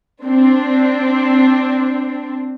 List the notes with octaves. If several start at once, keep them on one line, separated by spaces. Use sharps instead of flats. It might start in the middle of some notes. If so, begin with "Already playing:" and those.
C4 D4